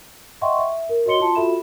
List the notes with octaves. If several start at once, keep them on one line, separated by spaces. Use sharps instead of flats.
D#5 E5 F#5 G5 C6 C#6
E5
A#4
F#4 C#5 D#5 C6 C#7 G7
F4 A5 C6
F4 F#4 A4 E5 B5 E7